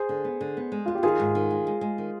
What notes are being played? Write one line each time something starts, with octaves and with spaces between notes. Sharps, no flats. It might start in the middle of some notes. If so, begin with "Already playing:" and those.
Already playing: G#4 C5
D3
B3
D3
B3
G#3
B3 F4
G4
D#3 F4 G#4
G#2
D#3
G#3
G#3
G#3
D#3